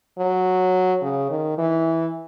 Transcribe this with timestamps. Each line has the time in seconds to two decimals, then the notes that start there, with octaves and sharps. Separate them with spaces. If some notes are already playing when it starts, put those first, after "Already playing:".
0.19 F#3
1.02 C#3
1.30 D#3
1.58 E3